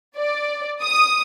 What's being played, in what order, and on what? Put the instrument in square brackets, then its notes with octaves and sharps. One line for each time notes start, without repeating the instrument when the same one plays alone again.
[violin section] D5
D#6